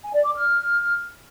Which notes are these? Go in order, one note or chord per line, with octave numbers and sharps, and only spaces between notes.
G#5
D5
D6
F6